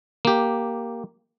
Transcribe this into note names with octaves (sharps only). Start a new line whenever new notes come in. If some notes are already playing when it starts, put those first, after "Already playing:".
A#3 G4